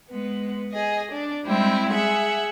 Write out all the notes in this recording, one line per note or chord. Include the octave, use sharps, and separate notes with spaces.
G#3 B3
G#4 D#5
D4
G3 G#3 C4 E4 G5
G#4 E5 F#5